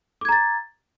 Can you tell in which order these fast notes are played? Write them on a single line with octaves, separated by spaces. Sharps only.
D6 G#6 A#5 A6